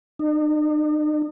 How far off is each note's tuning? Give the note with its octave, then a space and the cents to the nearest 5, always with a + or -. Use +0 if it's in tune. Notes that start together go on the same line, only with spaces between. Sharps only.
D#4 -45